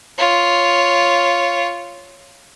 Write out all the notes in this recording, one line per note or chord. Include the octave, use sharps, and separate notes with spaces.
F4 C#5